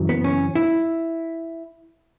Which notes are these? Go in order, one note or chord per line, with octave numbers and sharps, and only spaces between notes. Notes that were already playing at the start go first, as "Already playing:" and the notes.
Already playing: F#2 C#3 E3
B3
C#4
E4